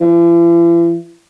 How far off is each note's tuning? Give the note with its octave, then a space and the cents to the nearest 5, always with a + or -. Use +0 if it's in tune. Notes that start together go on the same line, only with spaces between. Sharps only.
E3 +45